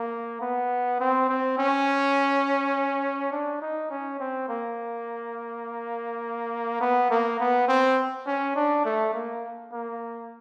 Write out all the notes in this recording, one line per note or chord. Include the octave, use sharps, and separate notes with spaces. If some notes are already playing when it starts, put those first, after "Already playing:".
Already playing: A#3
B3
C4
C4
C#4
D4
D#4
C#4
C4
A#3
B3
A#3
B3
C4
C#4
D4
A3
A#3
A#3